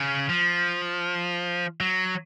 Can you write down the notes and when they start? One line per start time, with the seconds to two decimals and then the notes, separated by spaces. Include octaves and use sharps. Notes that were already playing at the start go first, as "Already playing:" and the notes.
Already playing: C#3
0.29 F3
1.80 F#3